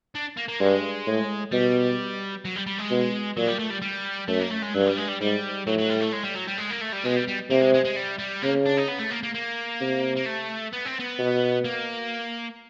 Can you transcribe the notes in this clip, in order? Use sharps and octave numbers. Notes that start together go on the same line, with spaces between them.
D4
A#3
A#3
G2 G#3
A2
B2 G3
F#3
G3
G3
G#3
B2
A#2 F#3
G3
A3
G3
G3
F#2 A3
A#3
A3
G#3
G2 F#3
G3
G#3
G3
G#2 G3
A2 F#3
F#3
G3
A3
G#3
G3
F#3
G3
G#3
A#3
A3
G3
B2 G#3
G3
G3
C3 A#3
G#3
G#3
G#3
G3
G3
C#3 A#3
D4
D#4
B3
A3
A#3
A#3
A#3
C3
A#3
A3
B3
C4
B3
B2
A#3